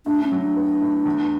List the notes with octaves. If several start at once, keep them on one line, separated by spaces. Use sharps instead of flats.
A2 D4
C#4
F#3
D4
B3
A2
E2